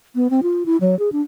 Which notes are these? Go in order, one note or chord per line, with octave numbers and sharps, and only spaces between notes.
B3
C4
F4
E4
F#3
G#4
D4